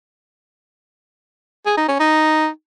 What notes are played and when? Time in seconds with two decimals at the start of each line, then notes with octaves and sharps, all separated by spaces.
1.66 G#4
1.77 D#4
1.88 C#4
2.00 D#4